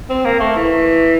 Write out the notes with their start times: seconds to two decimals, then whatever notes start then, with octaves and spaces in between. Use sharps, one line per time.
0.09 C4
0.25 A#3
0.40 A3
0.56 E3